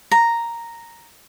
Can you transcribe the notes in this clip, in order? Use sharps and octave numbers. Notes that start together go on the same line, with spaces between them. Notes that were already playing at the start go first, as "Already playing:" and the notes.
A#5